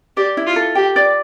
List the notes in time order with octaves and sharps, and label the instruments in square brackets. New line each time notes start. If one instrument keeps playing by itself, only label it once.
[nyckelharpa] G4 [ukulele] D5
[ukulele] E4
[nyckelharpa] F4
[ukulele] A4
[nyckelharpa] G4 [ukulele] G5
[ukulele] D5